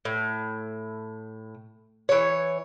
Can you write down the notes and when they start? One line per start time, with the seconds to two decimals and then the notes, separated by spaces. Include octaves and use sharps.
0.05 A2
2.09 E3 C#5